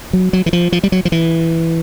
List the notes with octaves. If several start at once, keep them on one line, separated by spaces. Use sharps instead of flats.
F#3
F#3
E3
F3
F3
G3
F#3
F3
E3